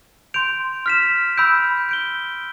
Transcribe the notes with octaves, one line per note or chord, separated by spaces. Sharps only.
C6 G6 D7 F7
F6 B6 E7
B5 E6 G6 D7
G6 D7 G7